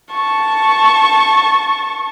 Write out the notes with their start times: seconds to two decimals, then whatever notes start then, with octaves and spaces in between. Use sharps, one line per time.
0.11 A5 C#6